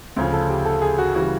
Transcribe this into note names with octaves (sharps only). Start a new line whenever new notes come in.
D2 C#3 F3
A4
G4
A4
G#4
F#4
C#3 E3 G3 F#4